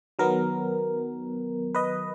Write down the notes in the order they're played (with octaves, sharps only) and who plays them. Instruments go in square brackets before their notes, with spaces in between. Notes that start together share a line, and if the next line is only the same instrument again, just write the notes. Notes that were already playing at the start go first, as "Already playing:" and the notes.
[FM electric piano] D#3 F#3 B3 A#4
B4 D#5